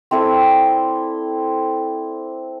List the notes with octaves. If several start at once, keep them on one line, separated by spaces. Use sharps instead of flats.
C4 E4 A4 D5